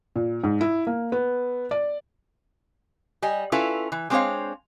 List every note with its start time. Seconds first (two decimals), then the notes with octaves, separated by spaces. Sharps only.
0.16 A#2
0.43 G#2
0.61 E4
0.87 A#3
1.12 B3
1.71 D5
3.22 G3 D#5 G#5
3.52 C#4 E4 F4 A4 B4
3.92 E3
4.10 G#3 C4 D4 C5 C#5 F5